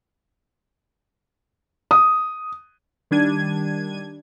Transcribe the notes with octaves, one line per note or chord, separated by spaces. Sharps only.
D#6
D#3 G3 D4 G#6 D#7